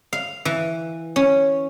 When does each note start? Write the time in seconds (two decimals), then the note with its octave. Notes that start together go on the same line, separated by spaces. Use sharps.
0.13 F5
0.45 E3
1.16 C#4